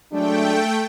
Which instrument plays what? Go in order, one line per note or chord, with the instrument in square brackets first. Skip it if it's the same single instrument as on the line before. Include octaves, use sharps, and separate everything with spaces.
[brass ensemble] F#3 G#3 D4 [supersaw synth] A3 G5